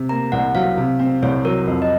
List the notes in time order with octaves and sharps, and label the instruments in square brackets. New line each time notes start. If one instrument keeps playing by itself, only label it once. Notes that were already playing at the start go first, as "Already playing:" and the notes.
Already playing: [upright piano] C3
[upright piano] A#3 [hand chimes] A#5
[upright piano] C2 [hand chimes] F#5
[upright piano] F#3 [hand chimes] F5
[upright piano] C3
C4
[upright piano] C2 [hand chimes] C#5
[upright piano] F#3 [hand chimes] A#4
[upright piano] F2
[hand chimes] D#5